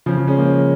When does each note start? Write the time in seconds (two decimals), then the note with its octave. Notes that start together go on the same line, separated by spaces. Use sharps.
0.06 C#3 F3
0.17 C#3 F3
0.28 G#3 C#4
0.38 F3 A#3